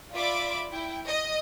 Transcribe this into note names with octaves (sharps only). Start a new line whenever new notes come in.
F4 D5 E5 B5 D6
E4 G5
D#5